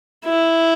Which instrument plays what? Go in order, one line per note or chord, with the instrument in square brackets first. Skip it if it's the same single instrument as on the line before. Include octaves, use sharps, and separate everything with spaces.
[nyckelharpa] E4